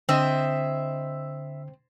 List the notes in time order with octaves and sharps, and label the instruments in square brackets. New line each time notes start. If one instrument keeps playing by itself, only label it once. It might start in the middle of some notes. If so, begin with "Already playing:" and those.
[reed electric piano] D3 [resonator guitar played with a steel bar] C4 [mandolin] E4 D#5 E5